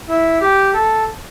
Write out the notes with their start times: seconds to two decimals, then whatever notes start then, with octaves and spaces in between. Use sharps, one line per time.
0.08 E4
0.40 G4
0.74 A4